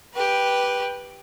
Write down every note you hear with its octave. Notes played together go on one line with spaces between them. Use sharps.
G4 B4